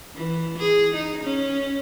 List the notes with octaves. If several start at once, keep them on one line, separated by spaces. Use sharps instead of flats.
E3
G#4
D#4
C#4